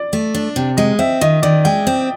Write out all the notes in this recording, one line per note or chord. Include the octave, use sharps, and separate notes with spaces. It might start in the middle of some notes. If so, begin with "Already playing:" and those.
Already playing: D5
A3
D4
C3
G#3 D#5
C4 E5
D#3 D#5
D#3 D5
G#3 G5
C4